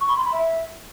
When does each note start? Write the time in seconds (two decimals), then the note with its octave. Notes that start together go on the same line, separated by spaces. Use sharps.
0.01 C#6
0.09 B5
0.17 C6
0.25 B5
0.32 E5